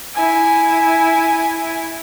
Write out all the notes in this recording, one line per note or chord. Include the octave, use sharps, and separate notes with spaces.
E4 G#5